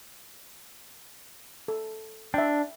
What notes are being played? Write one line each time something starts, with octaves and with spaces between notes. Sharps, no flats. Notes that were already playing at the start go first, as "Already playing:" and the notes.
A4
D4 E5 G5